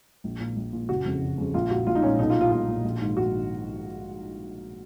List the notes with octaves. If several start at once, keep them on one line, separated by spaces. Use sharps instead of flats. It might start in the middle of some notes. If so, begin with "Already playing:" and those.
A#1
A#2
A#1
A#2
F#1 F#4
F2 C#3
F#1
F2 C#3
A#1 F4
A#2 F#4
A#1 F4
D#4
A#2 C#4
B1 D#4
F4
A#2
F4
B1 F4
A#2
A#1
G#2 D#3
A#1 F#4
D#3